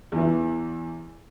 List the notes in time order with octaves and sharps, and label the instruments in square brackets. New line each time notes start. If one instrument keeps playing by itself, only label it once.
[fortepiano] E2 E3